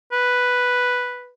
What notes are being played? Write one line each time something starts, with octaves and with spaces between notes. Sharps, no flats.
B4